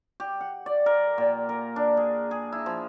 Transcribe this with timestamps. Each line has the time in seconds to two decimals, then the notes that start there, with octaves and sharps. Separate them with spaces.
0.20 G4
0.41 F#5
0.66 D5
0.86 A#4
1.18 A#2
1.49 A#4
1.76 D4
1.97 G#4
2.31 G#4
2.52 E4
2.66 F3